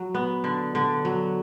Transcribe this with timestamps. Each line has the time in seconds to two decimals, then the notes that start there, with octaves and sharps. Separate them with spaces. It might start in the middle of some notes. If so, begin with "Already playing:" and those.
Already playing: F#3
0.15 B3
0.44 D3
0.75 D3
1.05 F#3